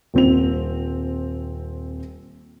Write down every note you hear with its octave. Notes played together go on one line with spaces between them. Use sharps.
D#1 C4 F7